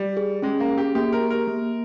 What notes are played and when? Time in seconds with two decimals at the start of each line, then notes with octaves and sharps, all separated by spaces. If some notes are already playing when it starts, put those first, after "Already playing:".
Already playing: G3
0.17 G#4
0.42 G#3 C#4
0.60 A#3
0.69 G#4
0.78 G4
0.95 A#3 G4
1.13 A#4
1.21 G4
1.30 A#4
1.48 A#3